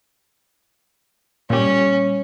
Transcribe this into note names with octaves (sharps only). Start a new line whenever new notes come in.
A#2 G3 C#4